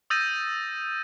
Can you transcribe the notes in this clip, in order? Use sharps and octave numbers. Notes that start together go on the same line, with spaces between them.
D#6 E6 G6 A6 A#6 D#7